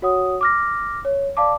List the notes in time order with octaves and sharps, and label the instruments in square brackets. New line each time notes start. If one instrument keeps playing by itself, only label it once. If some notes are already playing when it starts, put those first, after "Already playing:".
[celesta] F#4 C#5 F#5 D#6
D6 F6 A#6
C#5
D5 F5 A5 D6